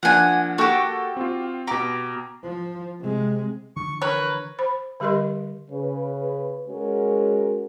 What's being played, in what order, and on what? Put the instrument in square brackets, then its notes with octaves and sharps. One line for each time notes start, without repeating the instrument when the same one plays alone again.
[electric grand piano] F3 A#3 D4 [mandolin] F#5 G#5
[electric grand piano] A#3 A4 G5 [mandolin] F#4 G4
[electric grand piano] C4 F4
[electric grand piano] B2 A#5 [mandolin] G4
[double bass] F3
C3 G#3
[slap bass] D3 E3 F3 [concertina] C#6
[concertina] A#4 [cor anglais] B4 [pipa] C#5
[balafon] C5 B5
D3 G3 G4 A#4 D#5 C6
[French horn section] C#3 B4
G#3 C#4 F#4 G#4 A#4